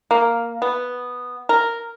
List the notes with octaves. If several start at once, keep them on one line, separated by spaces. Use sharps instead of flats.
A#3
B3
A#4